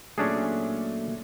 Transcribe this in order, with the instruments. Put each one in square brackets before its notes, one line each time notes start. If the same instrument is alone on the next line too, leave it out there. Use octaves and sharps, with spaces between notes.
[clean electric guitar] A#2 F#3 A3 [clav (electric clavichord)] C#4 D4 G#4